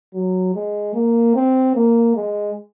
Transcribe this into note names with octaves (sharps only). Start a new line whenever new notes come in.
F#3
G#3
A#3
C4
A#3
G#3